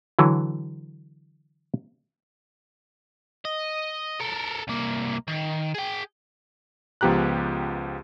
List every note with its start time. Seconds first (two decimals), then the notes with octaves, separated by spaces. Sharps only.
0.19 D3 E3 F#3
3.45 D#5
4.20 A4 A#4
4.68 C2 A#3
5.28 D#3
5.74 G#4 G5
7.01 C#2 F3 B3 G4 A#5 F#6